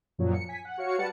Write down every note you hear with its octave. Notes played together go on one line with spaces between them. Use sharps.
F#2 A#2 F3 F#3
C#7
G#5 B6
F#5
F#4 C#5 F5 C#7
G3 B4 F#5 A5 A6 C#7